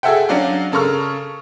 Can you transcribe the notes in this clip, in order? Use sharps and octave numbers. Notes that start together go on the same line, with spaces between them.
F#4 G#4 A4 E5 F#5 G5
F#3 C#4 D4 F#4 D5 F5
C#3 A4 A#4 C#6 F6